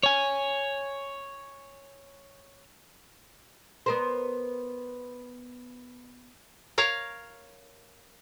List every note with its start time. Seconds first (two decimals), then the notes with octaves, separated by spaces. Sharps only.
0.03 C#5 G#5
3.86 B3 A#4 C5
6.78 A#4 C#5 F5